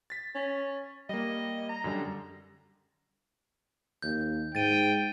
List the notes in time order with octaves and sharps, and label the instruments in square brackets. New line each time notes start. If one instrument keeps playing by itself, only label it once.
[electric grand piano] A6 B6
[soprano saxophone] C#4
[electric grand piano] G3 A#3 [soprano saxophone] D#5
[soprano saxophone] A#5
[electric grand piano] F#2 D3 G3
[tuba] D#2 [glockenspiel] G6
[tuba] G#2 [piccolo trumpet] G5 [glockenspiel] A6 D#7